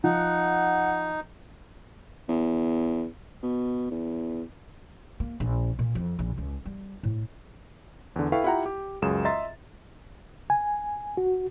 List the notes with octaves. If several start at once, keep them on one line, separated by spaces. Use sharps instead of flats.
F3 D#4 F#5
E2
B2
E2
A#3
A#1
A#2
F2
A#1
C#2
G3
A2
E2 D3
E4 A4 B4 F5 G5 C#6
E4 F4 G4 F#5 G5 A#5
G4
C#2 F#2 G#4 E7
D#5 E5 A#5 C6 A6
G#5
F#4